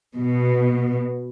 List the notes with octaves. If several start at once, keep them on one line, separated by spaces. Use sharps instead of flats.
B2